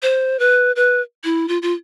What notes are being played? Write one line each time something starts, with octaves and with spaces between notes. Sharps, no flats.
C5
B4
B4
E4
F4
F4